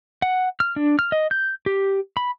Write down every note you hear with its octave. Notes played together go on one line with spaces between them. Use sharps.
F#5
F6
D4
F6
D#5
G6
G4
B5